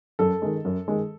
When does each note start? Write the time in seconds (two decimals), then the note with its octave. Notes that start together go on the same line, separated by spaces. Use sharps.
0.19 F#2 A4
0.42 D#3 G#3
0.65 F#2
0.88 D#3 G#3